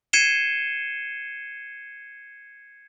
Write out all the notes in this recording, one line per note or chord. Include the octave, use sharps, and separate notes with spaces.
G#6 C7 C#7 D#7 E7 G7